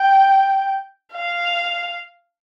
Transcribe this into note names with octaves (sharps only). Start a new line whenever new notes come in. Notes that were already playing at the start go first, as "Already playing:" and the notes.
Already playing: G5
F5